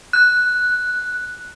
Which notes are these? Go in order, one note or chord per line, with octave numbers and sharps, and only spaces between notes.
F#6